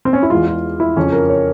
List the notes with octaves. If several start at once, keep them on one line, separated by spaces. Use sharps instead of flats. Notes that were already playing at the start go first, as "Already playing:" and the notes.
C4
C#4
E4
E2 E3 G#3 F4
F4
E4
F2 C#3 F3 C#4
A#4
C#5